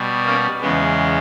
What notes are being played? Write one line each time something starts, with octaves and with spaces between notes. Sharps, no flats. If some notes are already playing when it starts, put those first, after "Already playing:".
Already playing: B2 G3
A#3 C#4
E2 C#3 G#3 B3